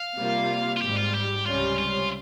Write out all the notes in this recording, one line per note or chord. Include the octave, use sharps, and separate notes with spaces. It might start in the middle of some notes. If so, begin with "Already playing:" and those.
Already playing: F5
C3 G3 A#3 F4
F4
G#1 G#2 G3 G4
F4
G4
C#2 C3 G3 C#4 F4
F4